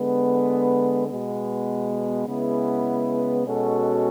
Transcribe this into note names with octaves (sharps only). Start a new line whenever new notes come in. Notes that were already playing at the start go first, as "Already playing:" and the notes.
Already playing: D3 G#3 B3
B2 G#3 B3
C#3 G#3 B3 E4
B2 G#3 C#4 F#4 A4